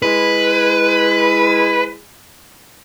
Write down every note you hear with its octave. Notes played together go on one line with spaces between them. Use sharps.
G#3 E4 B4